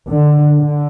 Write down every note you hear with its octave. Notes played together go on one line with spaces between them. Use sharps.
D3
D3